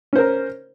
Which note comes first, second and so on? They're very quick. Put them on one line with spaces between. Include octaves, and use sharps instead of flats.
C#4 C5 A#4